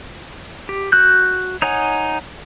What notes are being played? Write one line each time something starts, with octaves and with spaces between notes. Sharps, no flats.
G4
F#4 F#6 G6
D#4 C#5 F#5 G#5